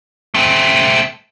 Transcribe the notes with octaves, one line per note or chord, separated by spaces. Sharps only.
A3 C4